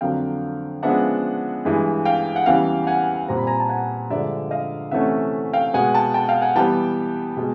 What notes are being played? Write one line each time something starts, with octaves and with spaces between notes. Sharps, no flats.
F2 D3 F#3 A#3 D4 F5 G5
C#3 F3 G#3 B3 D4 E5 F#5
G2 E3 G#3
F5 G5
F#5
E2 C#3 E3 G3 F5 G5
F#5 G#5
A#2 G3 C4 A#5
B5
G#5 A#5
A5
F#5 G#5
G2 D3 F3 G#3 D5 E5
D#5 F5
C3 E3 A3 C#4 E5 F#5
F5 G5
B2 G#3 B3 F#5 G#5
G5 A5
G5 A5
F5 G5
F#5 G#5
E3 G3 B3 G5 A5
B2 G#3